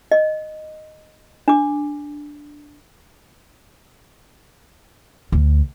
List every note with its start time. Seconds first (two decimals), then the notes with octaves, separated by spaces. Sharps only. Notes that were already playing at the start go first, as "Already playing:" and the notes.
0.12 D#5
1.48 D4 D6
5.32 D2